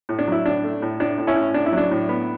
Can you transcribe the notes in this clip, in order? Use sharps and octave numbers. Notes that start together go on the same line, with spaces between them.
A2
D4
F#3 E4
A2 D4
A3
A2
A2 D4
A2
C#4 E4
A2
A2 D4
E4
F#3
D4
A2
B3